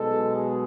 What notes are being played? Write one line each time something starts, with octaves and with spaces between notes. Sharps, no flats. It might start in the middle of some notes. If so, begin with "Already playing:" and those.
Already playing: B1 B2 G#3 A4
G#4